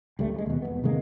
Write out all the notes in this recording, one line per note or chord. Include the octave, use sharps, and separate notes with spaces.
C#2 G3 A3
G2 G#3
D#2 B2
E2 G2 B3
C3 D#3 G#3 A#3